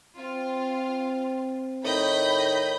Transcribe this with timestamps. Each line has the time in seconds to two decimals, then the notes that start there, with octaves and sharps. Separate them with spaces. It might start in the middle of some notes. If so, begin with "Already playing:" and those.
0.17 C4 F4
1.85 A2 D#3 D#5 B5 G6